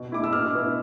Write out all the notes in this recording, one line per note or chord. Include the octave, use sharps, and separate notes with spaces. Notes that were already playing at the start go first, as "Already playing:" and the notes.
Already playing: B2
A3 E4 D6
E6
B2 F6
B3 E4